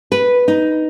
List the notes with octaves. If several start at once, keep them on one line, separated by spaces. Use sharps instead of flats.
B4
D#4